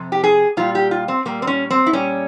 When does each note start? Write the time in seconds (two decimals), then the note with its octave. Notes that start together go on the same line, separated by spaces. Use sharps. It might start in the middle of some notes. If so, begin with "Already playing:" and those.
Already playing: F2 C3
0.12 G4
0.24 G#4
0.57 A#2 G3 F4
0.75 G4
0.91 F4
1.08 C4
1.25 A#2 G3 A#3
1.42 C4
1.47 C#4
1.71 C4
1.86 E4
1.93 A#2 G3 C#4